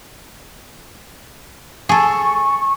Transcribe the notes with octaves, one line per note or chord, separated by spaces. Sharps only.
G#4 A4 C#6